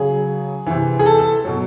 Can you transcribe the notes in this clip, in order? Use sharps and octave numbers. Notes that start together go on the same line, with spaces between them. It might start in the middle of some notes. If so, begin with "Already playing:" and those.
Already playing: C#3 F#3 G#4
C3 E3
G#4
A4
A4
B2 F#3